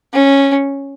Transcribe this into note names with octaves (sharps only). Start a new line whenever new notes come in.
C#4